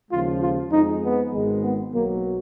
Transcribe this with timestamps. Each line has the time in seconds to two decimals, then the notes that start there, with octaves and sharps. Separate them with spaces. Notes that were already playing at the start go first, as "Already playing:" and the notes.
0.10 D#2 C#3 F3 G#3 F4
0.40 F4
0.71 F2 F3 G#3 D#4
1.01 B3
1.31 G#1 G#2 D#3 G#3
1.62 B3
1.93 B1 B2 F#3 A#3